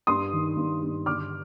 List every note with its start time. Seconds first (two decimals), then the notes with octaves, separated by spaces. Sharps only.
0.07 G2 C6 D#6
0.33 D#3
0.57 G2
0.82 G2
1.06 D3 D6 F6